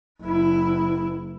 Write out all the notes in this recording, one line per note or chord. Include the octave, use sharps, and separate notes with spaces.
F#1 E4